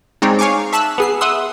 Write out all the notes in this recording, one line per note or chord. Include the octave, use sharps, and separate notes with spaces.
G#3 C4 D#4 C#5 D5
C#5 F5 G#5 C#6 D6
E5 A5 E6 F#6
B3 G#4 C7
E5 F#5 C6 D#6 E6